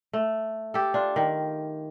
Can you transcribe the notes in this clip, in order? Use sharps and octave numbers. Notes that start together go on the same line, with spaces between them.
A3
G4 A4
D4 F4
D#3